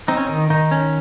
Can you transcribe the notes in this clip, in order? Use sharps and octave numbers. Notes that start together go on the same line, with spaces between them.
C4 D#4
C#4
D#3 D#4
D#3 D#4
C#4